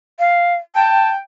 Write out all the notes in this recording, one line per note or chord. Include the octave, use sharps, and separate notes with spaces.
F5
G5 A5